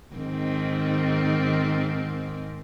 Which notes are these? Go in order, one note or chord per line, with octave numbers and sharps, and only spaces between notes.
G#2 D#3 C4